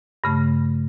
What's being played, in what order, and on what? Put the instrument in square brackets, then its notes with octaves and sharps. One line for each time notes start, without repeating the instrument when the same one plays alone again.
[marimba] G2 C#3 A3